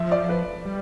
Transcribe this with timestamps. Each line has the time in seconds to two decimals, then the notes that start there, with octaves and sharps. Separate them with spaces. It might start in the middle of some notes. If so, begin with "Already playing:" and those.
Already playing: F3 E5
0.12 D5
0.29 B4
0.65 G3